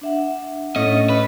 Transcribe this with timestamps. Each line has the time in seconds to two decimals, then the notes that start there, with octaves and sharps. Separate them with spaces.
0.01 D4 E5 F#5
0.76 A2 C#4 D#5
1.09 B4